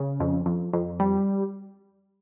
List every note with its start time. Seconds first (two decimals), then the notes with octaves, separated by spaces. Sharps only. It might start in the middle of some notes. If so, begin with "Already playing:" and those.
Already playing: C#3
0.20 F2
0.46 F2
0.73 F2
1.00 G3